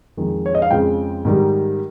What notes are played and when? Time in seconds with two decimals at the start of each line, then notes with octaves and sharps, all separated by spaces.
0.17 F2 D#3 G#3
0.46 C#5
0.55 D#5
0.62 F5
0.71 F2 C#3 F3 G#3 G5
1.25 G#2 D#3 G3